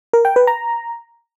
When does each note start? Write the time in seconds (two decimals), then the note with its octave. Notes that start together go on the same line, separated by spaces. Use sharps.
0.13 A#4
0.25 G5
0.36 B4
0.47 A#5